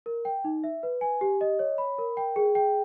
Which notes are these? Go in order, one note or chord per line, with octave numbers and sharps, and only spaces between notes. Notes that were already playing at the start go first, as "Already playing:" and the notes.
A#4
G5
D#4
E5
B4
G#5
G4
D#5
C#5
B5
A#4
G5
G#4
G5